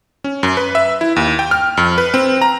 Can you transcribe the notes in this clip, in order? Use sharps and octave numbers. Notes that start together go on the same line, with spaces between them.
C#4
F#2
B4
E5
E4
D#2
G5
F6
F2
B4
C4
A#5